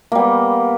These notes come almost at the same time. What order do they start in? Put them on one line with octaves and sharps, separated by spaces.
A#3 G3 B3